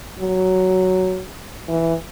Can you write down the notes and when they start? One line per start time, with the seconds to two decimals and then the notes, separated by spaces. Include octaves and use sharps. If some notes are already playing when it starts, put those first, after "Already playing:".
0.20 F#3
1.68 E3